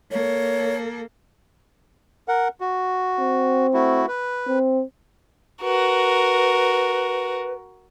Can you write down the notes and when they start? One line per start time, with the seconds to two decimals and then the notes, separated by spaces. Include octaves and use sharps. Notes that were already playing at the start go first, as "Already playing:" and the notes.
0.11 A#3 A4 C#5
2.28 A#4 F#5
2.60 F#4
3.20 C4
3.74 A3 E4 F#4
4.08 B4
4.48 C4
5.62 F#4 A#4 B4